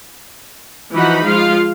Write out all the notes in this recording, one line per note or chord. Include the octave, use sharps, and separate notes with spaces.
E3 F3 D#4 F#4 F#5 B5
F3 G#3 F4 F5